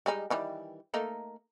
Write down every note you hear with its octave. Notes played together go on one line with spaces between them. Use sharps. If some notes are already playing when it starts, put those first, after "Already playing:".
G3 G#3 D#4
D#3 E3 G3
A3 A#3 D#4